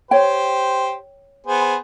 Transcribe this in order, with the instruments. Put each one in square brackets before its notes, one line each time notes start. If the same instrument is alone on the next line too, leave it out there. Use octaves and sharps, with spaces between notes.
[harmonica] G4 C5 [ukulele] C#5 G5
[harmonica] B3 G#4 C5